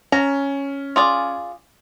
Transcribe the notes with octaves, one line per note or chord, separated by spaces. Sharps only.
C#4 A#5
F4 G#4 D5